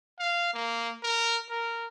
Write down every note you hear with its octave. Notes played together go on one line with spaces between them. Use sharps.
F5
A#3
A#4
A#4